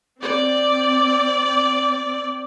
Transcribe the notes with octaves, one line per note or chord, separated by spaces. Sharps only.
C4 D5